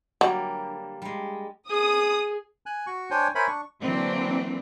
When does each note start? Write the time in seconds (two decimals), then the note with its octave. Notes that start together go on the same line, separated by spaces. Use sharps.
0.21 D3 F#3 G3 A#3
1.02 G3 G#3
1.69 G#4 D#6
2.66 G#5 F#6
2.87 F#4 C#6
3.11 D4 C5 C#5 G5 G#5
3.35 A#4 C5 C#5 E5 G#5 B5
3.48 D4 C#6
3.82 D3 E3 F#3 A#3 C4 D4